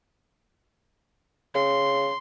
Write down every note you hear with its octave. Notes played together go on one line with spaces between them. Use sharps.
C#3 C6